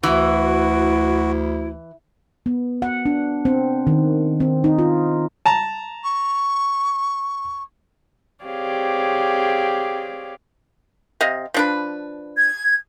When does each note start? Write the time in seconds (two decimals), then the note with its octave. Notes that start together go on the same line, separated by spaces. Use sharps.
0.03 D2 E3 E4 F#4
2.46 B3
2.82 F#5
3.06 D4
3.45 C4
3.87 D#3
4.40 C4
4.64 D#4
4.78 F4
5.46 A5 A#5
6.03 C#6
8.44 C4 G4 G#4 C#5 D5 F5
11.21 C3 D#5 F5
11.54 F3 D4 B4
12.37 G#6